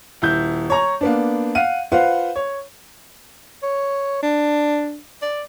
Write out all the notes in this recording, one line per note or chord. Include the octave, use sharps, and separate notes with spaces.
D#1 E4 G6
C#5 A#5 C#6
A#3 B3 D4
F5 F#5 D#7
F4 B4 C5 F5 F#5
C#5
C#5
D4
D5